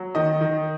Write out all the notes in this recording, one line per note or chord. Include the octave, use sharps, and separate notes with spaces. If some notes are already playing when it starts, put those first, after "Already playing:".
Already playing: F#3
D#3 D#5
D#3